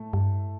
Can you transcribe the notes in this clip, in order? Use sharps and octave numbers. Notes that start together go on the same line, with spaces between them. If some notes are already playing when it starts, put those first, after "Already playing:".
Already playing: A2 A3
G2